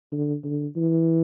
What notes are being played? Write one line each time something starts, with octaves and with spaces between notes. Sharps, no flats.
D3
D3
E3